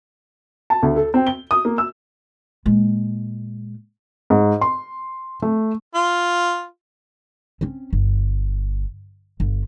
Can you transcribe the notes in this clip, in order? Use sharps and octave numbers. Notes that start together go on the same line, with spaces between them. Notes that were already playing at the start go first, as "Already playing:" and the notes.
A5
D2
A4
C4
G7
D#6
A#3
E6
A#2 G#3
G#2
C6
A3
F4
C4 C#4
G1
G1